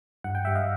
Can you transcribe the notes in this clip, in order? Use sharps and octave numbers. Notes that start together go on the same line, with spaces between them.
G2 F#5
G5
G3 E5 F#5
D#5 F5